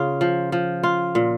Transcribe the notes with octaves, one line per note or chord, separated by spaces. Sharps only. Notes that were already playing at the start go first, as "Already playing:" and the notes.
Already playing: C#3 F4
F3
F3
F4
A#2